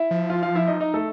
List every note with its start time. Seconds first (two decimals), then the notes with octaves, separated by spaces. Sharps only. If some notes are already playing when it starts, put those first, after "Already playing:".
Already playing: E4 E5
0.11 F3
0.30 F4 F5
0.43 F4 F5
0.55 E4 E5
0.68 D#4 D#5
0.80 D#4 D#5
0.94 A3 A4